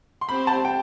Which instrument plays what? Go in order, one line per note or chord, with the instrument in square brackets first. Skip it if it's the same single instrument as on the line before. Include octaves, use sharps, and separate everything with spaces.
[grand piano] C6
[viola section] C4 G4 C5 [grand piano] B5
[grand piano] A5
G5